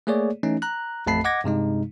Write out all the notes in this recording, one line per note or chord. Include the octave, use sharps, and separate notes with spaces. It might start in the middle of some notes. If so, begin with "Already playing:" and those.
A3 A#3 G#4 C#5 D5
E3 A3 C#4 D#4
A#5 F#6
A1 F2 A3 A5 B5 C7
D#5 F#5 D6 G#6 A#6
G2 C3 G#3 D#4